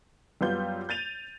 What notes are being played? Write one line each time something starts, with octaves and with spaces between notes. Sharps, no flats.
F#2 G3 B3 F4 G6
G6 A6 D#7 F7